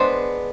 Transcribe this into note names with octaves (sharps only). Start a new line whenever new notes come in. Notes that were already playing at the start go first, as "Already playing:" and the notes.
Already playing: G#3 B3 D4 C5